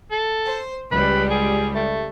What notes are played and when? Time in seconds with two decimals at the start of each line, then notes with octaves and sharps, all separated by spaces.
0.11 A4
0.46 C5
0.92 C#2 G3 B4
1.30 G#4
1.75 A3